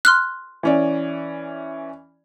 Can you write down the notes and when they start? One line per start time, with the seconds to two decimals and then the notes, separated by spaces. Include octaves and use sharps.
0.05 C6 F6 F#6
0.63 E3 C#4 D5